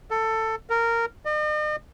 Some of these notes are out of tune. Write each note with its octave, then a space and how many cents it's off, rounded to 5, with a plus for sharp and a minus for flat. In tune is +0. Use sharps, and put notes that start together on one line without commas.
A4 +15
A#4 -15
D#5 -45